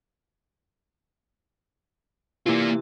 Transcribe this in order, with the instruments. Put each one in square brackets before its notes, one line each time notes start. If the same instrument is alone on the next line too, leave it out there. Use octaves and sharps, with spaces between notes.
[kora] C3 E3 [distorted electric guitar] A#3 F4